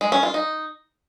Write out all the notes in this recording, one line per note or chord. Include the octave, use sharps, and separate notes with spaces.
G#3
C#4
F4
D#4